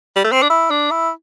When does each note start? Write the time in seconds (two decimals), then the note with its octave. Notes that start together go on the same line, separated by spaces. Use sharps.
0.16 G3
0.24 A3
0.32 C4
0.42 D4
0.50 E4
0.70 D4
0.91 E4